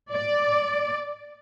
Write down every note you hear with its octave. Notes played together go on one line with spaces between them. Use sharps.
D5